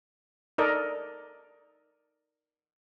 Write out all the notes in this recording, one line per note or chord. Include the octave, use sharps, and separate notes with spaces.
D#4 A4 A#4 D5 D#5